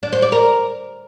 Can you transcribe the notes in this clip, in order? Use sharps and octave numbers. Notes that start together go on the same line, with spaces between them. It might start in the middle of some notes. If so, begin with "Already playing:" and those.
D4
C5
D5
A#4